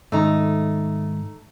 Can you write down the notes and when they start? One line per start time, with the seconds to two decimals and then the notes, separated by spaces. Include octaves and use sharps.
0.12 G#2 D#3 A3 D#4